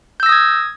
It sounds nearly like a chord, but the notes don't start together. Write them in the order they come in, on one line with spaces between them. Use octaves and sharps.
G6 E6 A#6 D#6 G#6